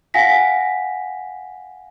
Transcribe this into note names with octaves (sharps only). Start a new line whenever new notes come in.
F5 F#5 G#5 A#6 B6